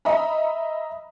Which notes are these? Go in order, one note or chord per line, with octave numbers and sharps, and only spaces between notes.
D#5 E5 A#5 B5